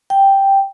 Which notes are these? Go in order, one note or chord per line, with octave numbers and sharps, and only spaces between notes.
G5